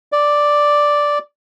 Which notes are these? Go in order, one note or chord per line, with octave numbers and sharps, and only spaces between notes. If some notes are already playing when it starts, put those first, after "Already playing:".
D5